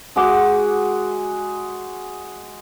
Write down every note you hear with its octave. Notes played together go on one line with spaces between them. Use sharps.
G#3 F#4 F#5 D6